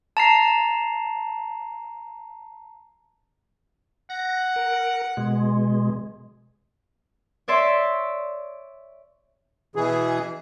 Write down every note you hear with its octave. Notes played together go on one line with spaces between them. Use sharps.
A5 A#5 C7
F#5 A#6
A#4
B2 G#3
C#5 D5 E5 C6
B2 E3 G#4